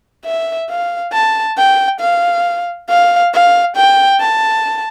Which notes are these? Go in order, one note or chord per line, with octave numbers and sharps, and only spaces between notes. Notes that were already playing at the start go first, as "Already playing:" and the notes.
E5
F5
A5
G5
F5
F5
F5
G5
A5